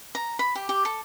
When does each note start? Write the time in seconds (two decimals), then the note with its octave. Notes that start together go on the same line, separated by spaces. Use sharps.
0.15 A#5
0.39 B5
0.55 G4
0.69 G4
0.85 A4